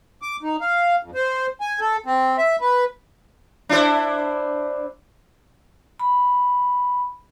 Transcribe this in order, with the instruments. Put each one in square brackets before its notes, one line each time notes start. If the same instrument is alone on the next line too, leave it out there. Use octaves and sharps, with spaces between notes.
[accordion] D6
D#4
F5
F2
C5
G#5
A4
C4
E5
B4
[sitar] D4 E4 C5
[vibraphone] B5